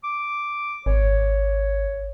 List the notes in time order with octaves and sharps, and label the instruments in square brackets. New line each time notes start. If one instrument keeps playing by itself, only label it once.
[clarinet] D6
[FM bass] G#1 [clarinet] C#5